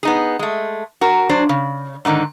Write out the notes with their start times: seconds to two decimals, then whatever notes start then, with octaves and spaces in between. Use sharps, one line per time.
0.03 B3 D#4 G#4
0.39 G#3 A3
1.01 F#4 A#4
1.29 F#3 D4 C5
1.49 C#3
2.05 G#2 D3 D#3 D#4